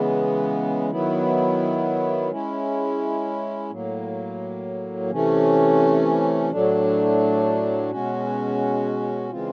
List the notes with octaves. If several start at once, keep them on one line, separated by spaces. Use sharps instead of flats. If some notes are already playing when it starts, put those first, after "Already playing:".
Already playing: C#3 E3 G#3 B3
D#3 F#3 B3 E4
G#3 C#4 E4
A2 F#3 A#3
C3 E3 A3 C#4
A2 F#3 A3 D4
B2 G#3 C#4 F#4
C#3 E3 G#3 C4 F4